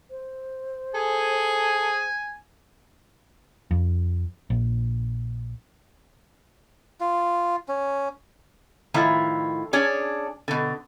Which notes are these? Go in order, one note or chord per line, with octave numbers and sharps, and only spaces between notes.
C5
G#4 A4 G#5
F2
A#1
F4
C#4
A2 D#3 F3 E4
C#4 D4 G#4 C#5
B2 D3